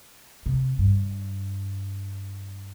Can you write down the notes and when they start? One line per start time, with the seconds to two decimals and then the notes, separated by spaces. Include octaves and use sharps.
0.46 C3
0.79 G2